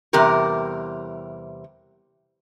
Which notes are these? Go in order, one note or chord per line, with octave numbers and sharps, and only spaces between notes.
E2 C3 G3 G4 A#4